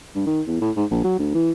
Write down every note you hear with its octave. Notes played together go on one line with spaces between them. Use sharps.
G2
D#3
E2
A2
G#2
A#1
F#3
D2
E3